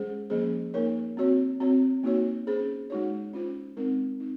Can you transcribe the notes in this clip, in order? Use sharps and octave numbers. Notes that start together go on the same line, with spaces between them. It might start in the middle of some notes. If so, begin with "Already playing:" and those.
Already playing: G#3 C#4 G#4 C5
F3 A#3 C#4 G#4 C5
A#3 D#4 A#4 C#5
C4 F#4 C#5
C4 F#4 C#5
A#3 D#4 F#4 C#5
C#4 G#4 C5
G#3 D#4 F#4 C#5
C#4 F4 C5
G#3 C4 D#4 A#4
C4 D#4